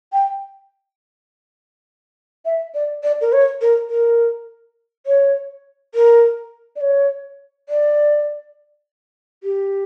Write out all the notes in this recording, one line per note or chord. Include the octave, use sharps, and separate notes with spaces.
G5
E5
D5
D5
A#4
C#5
A#4
A#4
C#5
A#4
D5
C#5
D5
G4